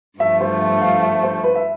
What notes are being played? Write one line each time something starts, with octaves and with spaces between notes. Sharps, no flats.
G2 F3 A3 E5
C5
E5
F5
E5
C5
B4
E5